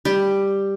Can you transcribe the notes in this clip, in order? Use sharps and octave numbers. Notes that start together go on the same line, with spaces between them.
G3 G4